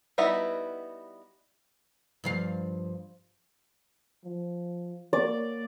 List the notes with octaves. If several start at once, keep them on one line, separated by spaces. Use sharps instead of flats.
G3 B3 D#4 E4 F#4
G2 F3 F5
F3
A#3 D5